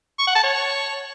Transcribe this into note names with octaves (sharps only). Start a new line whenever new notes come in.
C#6
F#5
A5
C#5